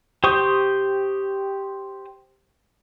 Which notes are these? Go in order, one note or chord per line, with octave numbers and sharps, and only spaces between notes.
G4 C5 C#6 D#6